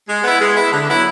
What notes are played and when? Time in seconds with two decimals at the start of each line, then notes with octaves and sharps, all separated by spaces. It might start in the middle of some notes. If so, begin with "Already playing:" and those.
0.09 G#3
0.24 B3 E4
0.41 G#3
0.57 B3 E4
0.73 D3
0.88 F#3 B3 E4